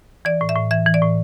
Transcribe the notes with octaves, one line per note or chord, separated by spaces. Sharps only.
E3 D5
A2
E5
A2
E3 E5
E3
D5
A2